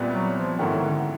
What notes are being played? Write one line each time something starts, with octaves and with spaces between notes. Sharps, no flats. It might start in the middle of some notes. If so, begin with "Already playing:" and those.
Already playing: C2 A#2 G3 B3
F#3
F3
G#2 D#3 E3 A3 C#4 F#4
D3